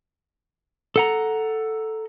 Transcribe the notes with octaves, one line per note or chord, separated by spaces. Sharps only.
A4 F#5 A#5